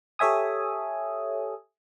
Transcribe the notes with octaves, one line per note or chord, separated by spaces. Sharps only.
G4 A4 C#5 E5 G#5 D#6